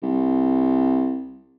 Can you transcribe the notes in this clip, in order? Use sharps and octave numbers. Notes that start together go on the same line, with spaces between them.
C2